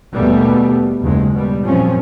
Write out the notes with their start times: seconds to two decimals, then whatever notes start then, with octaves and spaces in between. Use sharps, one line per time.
0.14 D#2 B2 G3 A3 B3
1.03 F#1 D#2 C#3 G#3
1.34 B2 G3
1.65 F#2 A#2 F3 C4 C#4